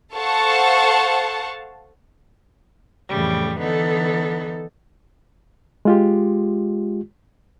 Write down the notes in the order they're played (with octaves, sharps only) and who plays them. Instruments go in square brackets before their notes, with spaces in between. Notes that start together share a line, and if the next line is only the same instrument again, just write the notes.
[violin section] A4 C5 F5 F#5 A5 C#6
[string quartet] F2 A2 C#3 E3 G3
D3 E3 B3 D#4 A4
[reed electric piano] G#3 F4 G4